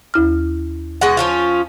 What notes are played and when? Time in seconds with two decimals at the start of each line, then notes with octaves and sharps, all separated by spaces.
0.14 D#2 E4 F6
1.01 B2 G#3 F#5
1.17 F3 C#4 F4